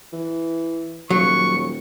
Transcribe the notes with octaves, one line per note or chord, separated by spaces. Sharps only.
E3
D#1 F#3 C#6